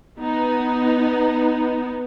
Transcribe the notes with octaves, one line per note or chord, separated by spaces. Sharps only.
B3 D#4